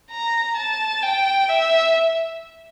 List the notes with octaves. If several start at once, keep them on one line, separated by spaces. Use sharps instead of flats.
A#5
A5
G5
E5